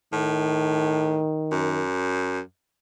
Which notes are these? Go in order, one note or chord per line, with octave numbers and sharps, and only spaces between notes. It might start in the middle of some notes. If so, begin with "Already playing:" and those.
A2 D#3
F#2